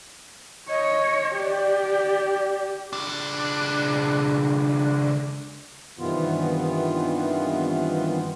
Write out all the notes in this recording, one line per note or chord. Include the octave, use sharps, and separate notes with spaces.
C#5 D#5
G4 D5
C#2 D4
G2 C3 D#3 E3 B3 F4